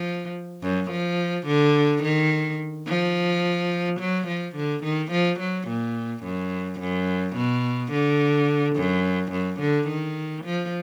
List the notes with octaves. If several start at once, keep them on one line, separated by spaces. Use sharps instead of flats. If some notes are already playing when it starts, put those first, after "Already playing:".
Already playing: F3
F#2
F3
D3
D#3
F3
F#3
F3
D3
D#3
F3
F#3
A#2
F#2
F#2
B2
D3
F#2
F#2
D3
D#3
F3